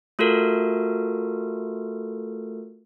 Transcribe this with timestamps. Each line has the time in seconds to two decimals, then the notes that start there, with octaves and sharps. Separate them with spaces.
0.19 A3 F4 F#4 A4 A#4